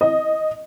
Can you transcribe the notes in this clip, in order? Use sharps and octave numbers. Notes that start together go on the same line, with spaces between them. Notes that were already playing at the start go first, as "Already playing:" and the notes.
D#5